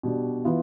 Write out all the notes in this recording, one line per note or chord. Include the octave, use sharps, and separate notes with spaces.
B2 G3 D4
E3 B3 F4